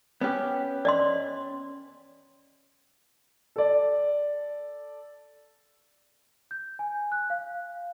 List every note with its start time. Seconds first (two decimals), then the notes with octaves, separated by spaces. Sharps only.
0.21 B3 C#4 G4
0.85 D5 D#5 C6
3.56 A4 D5
6.51 G6
6.79 G#5
7.12 F#6
7.30 F5